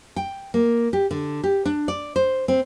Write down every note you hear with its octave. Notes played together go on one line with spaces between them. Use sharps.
G5
A#3
G4
D3
G4
D4
D5
C5
C4